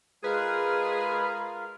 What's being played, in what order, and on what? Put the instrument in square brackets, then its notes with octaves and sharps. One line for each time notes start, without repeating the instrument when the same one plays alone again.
[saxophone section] G#3 G#4 [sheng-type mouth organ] F4 A#4 [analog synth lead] B4